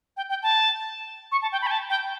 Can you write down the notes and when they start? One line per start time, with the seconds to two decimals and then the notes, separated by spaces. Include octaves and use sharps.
0.17 G5
0.30 G5
0.43 A5
1.32 C#6
1.42 A5
1.52 G5
1.62 B5
1.67 G5
1.71 A5
1.90 G5